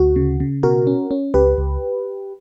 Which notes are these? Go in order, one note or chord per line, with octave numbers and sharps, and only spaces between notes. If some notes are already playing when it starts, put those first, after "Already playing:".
Already playing: D2 F#4
C#3
C#3
B2 F#4 A#4
C#4
C#4
C#2 G4 B4
C#2